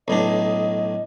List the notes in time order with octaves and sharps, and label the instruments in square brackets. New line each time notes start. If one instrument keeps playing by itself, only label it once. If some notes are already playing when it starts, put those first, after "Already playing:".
[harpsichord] B1 A2 D4 [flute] D#5